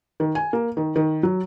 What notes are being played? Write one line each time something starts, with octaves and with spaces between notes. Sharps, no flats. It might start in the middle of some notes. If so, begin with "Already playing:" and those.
D#3
G#5
A#3
D#3
D#3
F#3